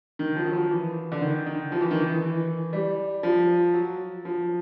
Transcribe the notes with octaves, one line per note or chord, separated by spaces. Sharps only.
D#3
F3
F#3
F3
E3
D3
D#3
D#3
F3
E3
D#3
E3
E3
G3
F3
F#3
F3